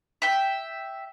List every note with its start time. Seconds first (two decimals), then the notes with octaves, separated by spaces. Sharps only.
0.22 E5 G5